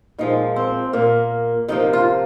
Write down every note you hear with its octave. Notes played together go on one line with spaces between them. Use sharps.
A#2 F3 G#3 D#4
C4
A#2 A#3
C3 F3 A#3 D#4
F4